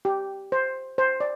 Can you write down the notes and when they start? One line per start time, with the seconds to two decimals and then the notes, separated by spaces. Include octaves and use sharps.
0.05 G4
0.52 C5
0.98 C5
1.20 D5